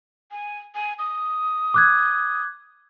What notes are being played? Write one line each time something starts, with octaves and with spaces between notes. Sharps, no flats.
G#5
G#5
D#6
D6 F#6 G#6